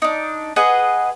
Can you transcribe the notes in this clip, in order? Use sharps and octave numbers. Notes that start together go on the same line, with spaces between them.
D4 D#4
G#4 B4 D#5 F#5